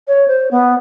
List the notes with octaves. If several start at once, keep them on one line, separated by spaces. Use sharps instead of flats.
C#5
C5
B3